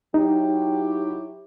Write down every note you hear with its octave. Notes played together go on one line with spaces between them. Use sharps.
F#3 D#4 E4 G4